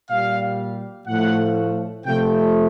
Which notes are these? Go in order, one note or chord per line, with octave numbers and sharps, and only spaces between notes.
A#2 G3 F5
A2 F3 A3 F#5
C3 F3 A3 G5